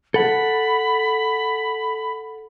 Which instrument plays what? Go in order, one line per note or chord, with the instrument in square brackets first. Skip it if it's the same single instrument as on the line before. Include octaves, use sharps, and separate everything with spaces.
[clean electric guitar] A4 F#5 [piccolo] B5